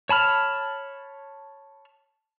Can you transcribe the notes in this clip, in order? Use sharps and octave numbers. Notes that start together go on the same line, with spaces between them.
C#5 A5 B5 F6